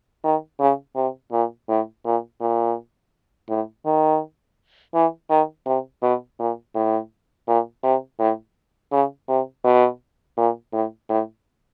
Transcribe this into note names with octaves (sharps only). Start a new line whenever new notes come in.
D#3
C#3
C3
A#2
A2
A#2
A#2
A2
D#3
E3
D#3
C3
B2
A#2
A2
A#2
C3
A2
C#3
C3
B2
A#2
A2
A2